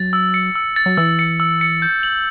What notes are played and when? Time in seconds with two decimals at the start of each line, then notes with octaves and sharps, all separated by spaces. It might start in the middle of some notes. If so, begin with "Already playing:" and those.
Already playing: F#3 A6
0.13 E6
0.34 C#7
0.55 E6
0.76 A6
0.86 F#3
0.97 E3 E6
1.19 C#7
1.40 E6
1.61 C#7
1.82 G6
2.03 F#7